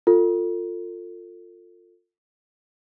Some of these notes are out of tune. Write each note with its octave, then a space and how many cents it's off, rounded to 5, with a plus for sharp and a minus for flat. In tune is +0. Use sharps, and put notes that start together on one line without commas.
F4 +10 A4 +30